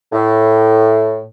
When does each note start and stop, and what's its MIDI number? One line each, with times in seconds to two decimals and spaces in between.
0.13 1.23 45